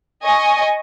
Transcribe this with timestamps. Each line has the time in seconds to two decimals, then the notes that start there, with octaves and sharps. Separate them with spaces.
0.25 D#5 G#5 C#6